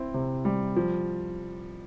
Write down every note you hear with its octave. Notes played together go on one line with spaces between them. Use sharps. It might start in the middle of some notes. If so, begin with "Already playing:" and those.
Already playing: C4 E4
C3
G3
F3